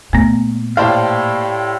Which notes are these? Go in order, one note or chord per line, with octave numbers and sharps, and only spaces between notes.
A#2 A3 B3
A2 G4 C5 D5 F5 A5